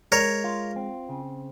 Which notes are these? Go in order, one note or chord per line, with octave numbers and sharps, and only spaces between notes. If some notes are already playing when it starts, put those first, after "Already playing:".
G#3 A#4 C#5
F4
C4
C#3